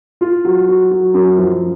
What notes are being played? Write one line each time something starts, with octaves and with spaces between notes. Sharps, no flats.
F4
F#3
F#3
F#3
F#2
F3